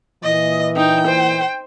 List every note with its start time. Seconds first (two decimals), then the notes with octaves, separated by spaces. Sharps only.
0.24 A#2 E3 D#5
0.76 D#4 G5
1.06 C5